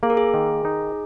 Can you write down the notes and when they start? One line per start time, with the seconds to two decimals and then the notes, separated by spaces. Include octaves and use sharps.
0.03 A#3 G#4
0.10 A#4
0.17 G#4
0.34 D#3
0.65 D#4